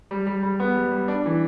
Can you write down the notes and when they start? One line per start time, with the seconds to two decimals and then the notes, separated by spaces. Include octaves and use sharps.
0.11 G3
0.27 G3
0.43 G3
0.60 B3
0.76 G3
0.92 G3
1.08 D4
1.26 E3